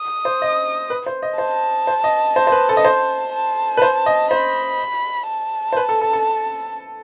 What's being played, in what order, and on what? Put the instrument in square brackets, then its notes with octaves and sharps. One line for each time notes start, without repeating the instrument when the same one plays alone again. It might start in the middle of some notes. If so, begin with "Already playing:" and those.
Already playing: [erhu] D#6
[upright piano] C5
D#5
B4
C5
D#5
[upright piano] C5 [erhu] A5
[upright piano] C5
D#5
C5
C5
B4
A4
D#5
C5
[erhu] A5
[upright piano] B4
C5
D#5
[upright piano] C5 [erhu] B5
[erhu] A5
[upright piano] C5
B4
A4
A4
A4